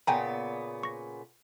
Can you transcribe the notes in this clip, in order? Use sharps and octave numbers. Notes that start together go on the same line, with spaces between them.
A#2 C#3 B3 G5 G#5 A#5
C#6 A#6